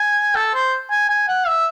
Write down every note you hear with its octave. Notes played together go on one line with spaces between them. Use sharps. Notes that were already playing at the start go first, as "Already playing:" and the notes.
Already playing: G#5
A4
C5
G#5
G#5
F#5
E5